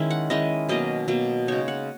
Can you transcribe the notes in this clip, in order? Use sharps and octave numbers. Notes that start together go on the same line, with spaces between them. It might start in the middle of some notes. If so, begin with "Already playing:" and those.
Already playing: D#3 G#3 C#4 E4
F#5
D#3 G#3 C#4 E4 D#5
B2 F#3 A#3 D#5
B2 F#3 A#3
C#3 G#3 D#4 C#5
F#5